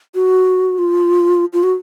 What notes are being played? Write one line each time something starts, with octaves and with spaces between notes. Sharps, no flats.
F#4
F4
F4
F#4